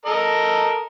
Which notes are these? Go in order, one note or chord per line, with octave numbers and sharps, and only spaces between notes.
A4 A#4 D#5